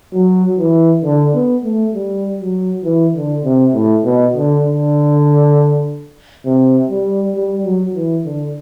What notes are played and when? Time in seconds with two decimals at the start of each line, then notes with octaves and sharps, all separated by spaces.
0.14 F#3
0.59 E3
1.04 D3
1.35 B3
1.64 A3
1.94 G3
2.40 F#3
2.84 E3
3.15 D3
3.45 C3
3.74 A2
4.05 B2
4.35 D3
4.64 D3
6.45 C3
6.90 G3
7.35 G3
7.65 F#3
7.95 E3
8.26 D3